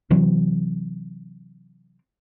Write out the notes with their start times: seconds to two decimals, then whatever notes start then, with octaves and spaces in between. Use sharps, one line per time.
0.10 C3 E3 F#3 C4